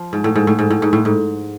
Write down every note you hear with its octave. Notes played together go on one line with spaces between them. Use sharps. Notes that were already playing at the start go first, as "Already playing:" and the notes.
Already playing: F3
G#2
A2
G#2
A2
G#2
A2
G#2
A2
G#2